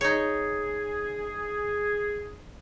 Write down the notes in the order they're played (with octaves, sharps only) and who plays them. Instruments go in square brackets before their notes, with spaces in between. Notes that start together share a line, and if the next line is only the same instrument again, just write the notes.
[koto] D#4 C#5 [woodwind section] G#4